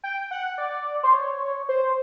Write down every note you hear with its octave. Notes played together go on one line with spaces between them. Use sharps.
G5
F#5
D5
C5
C#5
C5